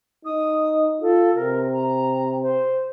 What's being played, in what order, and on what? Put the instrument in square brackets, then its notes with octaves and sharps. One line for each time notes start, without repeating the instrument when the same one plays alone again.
[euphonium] D#4 [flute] D#6
[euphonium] F4 [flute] A4
[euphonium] C3 [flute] A#4
[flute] A#5
C5